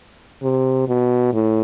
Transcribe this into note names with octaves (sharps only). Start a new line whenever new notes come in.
C3
B2
A2